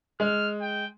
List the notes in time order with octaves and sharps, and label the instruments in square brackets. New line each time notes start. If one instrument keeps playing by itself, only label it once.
[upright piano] G#3 [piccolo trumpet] F6
[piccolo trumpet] G5